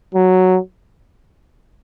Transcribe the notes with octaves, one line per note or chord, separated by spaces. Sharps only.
F#3